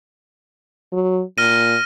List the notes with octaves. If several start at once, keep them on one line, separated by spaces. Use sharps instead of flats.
F#3
A#2 F6 A#6 D#7